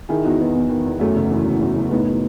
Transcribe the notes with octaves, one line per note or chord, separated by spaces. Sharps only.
D#3 E4 G#4
E2 D#4 F#4
F#3 B3 D#4
E2
D#3
E2
F#2 A3 C#4
F#1
E3
F#1
F#2
F#1
A2 B3 D#4